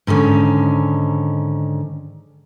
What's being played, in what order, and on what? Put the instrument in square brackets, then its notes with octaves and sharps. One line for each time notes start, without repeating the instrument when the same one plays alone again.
[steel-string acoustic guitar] G#2 D3 D#3 C#4